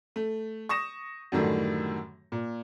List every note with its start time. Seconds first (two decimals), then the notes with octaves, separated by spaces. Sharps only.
0.16 A3
0.69 C#6 D#6 A#6 E7
1.32 F#2 A2 D3 D#3 G3 A3
2.32 A#2